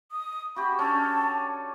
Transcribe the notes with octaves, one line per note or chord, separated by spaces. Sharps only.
D#6
F#4 G4 B5
C#4 D4 A4 A5